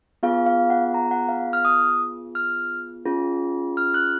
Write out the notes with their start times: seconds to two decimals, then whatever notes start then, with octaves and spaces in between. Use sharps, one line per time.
0.23 B3 F4 G#4 F5
0.46 F5
0.70 F#5
0.94 A#5
1.11 F#5
1.29 F5
1.53 F6
1.65 D#6
2.35 F6
3.06 C#4 F4 G#4
3.77 F6
3.94 F#6